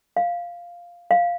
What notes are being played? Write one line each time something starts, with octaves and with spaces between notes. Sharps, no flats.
F5
F5